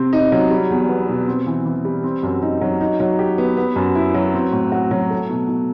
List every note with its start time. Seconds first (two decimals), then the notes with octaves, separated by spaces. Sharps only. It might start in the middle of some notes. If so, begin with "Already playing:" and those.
Already playing: C3 C4
0.13 D#4
0.32 F#3
0.50 G3
0.70 E2
0.89 B3
1.08 B2
1.27 C4
1.47 E3
1.66 E3
1.84 G3
2.03 C4
2.23 F#2
2.42 D#4
2.61 F#3
2.81 D#4
3.00 F#3
3.19 G4
3.38 B3
3.57 B3
3.76 F#2
3.95 E4
4.14 F#3
4.34 C4
4.52 A2
4.72 F#4
4.91 F#3
5.10 A3
5.29 B2
5.48 B2